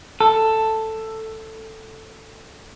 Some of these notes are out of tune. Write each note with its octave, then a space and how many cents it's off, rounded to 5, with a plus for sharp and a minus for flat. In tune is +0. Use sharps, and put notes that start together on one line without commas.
A4 +5